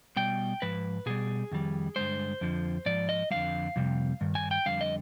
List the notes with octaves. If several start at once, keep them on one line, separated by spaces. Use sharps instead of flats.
B2 G3 G5
G#2 F3 B4
B2 G3 G#4
F2 D#3 G3
G2 D3 G#3 C5
F2 D3 F3
G#2 F3 D5
D#5
F2 D3 G3 F5
F2 C3 G3
G2 D#3
G#5
G5
F2 D3 G3 F5
D#5